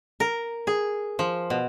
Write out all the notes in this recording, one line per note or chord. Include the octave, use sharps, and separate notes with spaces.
A#4
G#4
F3
B2